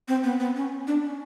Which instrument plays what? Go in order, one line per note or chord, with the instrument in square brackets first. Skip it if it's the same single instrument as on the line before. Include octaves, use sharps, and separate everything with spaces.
[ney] C4
B3
B3
C#4
D4
C#4